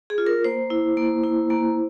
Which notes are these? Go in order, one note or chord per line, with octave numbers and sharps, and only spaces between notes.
G#4
F4
A#4
A#3 C5
E4
A#3
E4
A#3